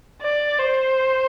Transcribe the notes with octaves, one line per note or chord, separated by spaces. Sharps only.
D5
C5